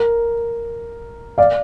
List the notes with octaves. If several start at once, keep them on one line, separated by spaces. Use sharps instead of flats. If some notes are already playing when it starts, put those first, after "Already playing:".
Already playing: A#4
D5 F5